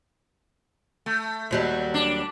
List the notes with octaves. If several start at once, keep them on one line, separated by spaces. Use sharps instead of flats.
A3
D#2 F#3 G3
D4